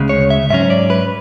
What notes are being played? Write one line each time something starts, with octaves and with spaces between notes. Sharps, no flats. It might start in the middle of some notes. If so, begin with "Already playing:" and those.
Already playing: D2 C#3 G#3
C#5
E5
G#2 F#3 C#4 E5
D5
B4